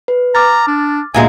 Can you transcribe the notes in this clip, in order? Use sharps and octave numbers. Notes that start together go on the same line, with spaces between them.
B4
A#5 D6 F6 A6
D4
D2 A#2 G#3 G#5